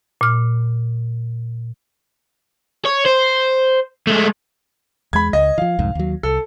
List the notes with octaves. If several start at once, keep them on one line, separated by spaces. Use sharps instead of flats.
A#2 F6
C#5
C5
G#3 A3
E2 G#3 B5 G#6
C#2 D#5
E3 F3 F5
C2 F2 G#2
D#2 F#3
C2 A4